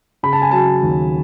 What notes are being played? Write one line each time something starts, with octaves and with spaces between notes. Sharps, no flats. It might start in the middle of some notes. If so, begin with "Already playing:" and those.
C#3 B5
A5
G#5
F#3 A5
D#2